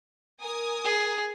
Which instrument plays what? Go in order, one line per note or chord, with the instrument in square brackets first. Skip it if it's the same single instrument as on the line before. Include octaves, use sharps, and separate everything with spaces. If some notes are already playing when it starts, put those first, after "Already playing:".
[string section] A#4 G#5 D#6
[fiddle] G#4